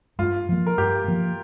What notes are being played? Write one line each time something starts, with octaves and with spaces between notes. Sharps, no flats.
G2 F4
F3 A#3
A#4
G2 G4
F3 A#3